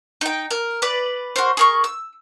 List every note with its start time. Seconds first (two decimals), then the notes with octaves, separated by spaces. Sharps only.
0.21 D#4 G5
0.51 A#4
0.82 B4 D5
1.36 F#4 A#4 C5
1.57 G#4 A#4 C#6
1.84 E6